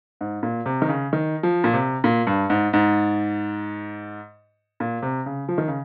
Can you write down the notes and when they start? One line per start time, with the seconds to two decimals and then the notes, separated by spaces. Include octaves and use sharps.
0.21 G#2
0.43 A#2
0.66 C3
0.82 D#3
0.89 C#3
1.13 D#3
1.43 F3
1.64 A#2
1.74 C3
2.04 A#2
2.27 G2
2.50 G#2
2.73 G#2
4.80 A#2
5.02 C3
5.26 C#3
5.49 F3
5.58 D#3
5.68 C#3